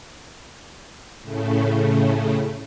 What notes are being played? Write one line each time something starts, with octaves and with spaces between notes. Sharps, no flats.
A2 C#3 A3